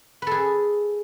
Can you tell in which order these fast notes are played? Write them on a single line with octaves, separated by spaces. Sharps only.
B4 A4 G#4